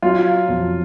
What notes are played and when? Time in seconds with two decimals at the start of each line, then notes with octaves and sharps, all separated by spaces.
0.02 F#3 F4
0.49 F2